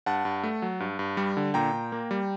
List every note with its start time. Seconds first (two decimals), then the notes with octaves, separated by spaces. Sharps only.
0.06 G2 F#5 A5
0.25 G2
0.43 A3
0.62 F#3
0.80 G2
0.99 G2
1.17 G3
1.37 D3
1.54 A#2 G5 A#5
1.73 A#2
1.92 A#3
2.11 G3